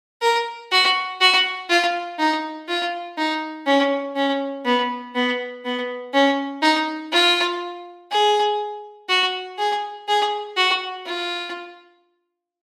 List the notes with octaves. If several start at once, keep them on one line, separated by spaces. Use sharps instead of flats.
A#4
F#4
F#4
F4
D#4
F4
D#4
C#4
C#4
B3
B3
B3
C#4
D#4
F4
G#4
F#4
G#4
G#4
F#4
F4